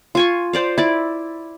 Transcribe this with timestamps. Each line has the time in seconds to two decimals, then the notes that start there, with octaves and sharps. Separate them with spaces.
0.15 F4 G#5 C#6
0.53 C5 D5 F5
0.78 E4 D5